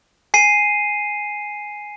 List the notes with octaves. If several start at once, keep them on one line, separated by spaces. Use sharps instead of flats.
G#5 C7 D#7